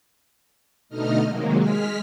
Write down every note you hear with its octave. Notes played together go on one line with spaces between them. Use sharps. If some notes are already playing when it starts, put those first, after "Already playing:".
B2 D3 A3 D#4 D#5 F6
C3 D#3 F#3 G#3 A#3
G#3 F6 B6